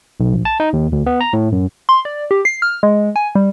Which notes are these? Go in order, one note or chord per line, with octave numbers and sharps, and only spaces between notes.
B1
A#1
A5
D#4
D#2
D2
B3
A#5
A2
F#2
C6
D5
G4
C7
F6
G#3
G#5
G3